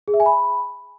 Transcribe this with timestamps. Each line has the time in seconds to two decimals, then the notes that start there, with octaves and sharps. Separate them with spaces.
0.08 G#4
0.14 E5
0.20 G#5
0.26 B5